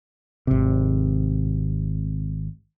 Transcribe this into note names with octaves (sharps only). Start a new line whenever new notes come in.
G#1 C3